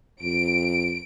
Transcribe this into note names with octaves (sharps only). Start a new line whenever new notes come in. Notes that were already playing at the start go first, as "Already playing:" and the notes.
F2 D7